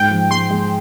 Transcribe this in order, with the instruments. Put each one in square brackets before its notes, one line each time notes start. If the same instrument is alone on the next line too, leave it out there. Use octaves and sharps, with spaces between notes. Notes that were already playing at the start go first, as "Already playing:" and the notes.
Already playing: [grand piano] G#2 [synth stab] G5
[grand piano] F3
[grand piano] G#3 [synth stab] C6
[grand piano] G#3